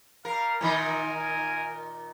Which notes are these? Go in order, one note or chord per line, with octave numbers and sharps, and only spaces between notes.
G3 A#4 F5
A#2 D#3 D#4 A#4 G#5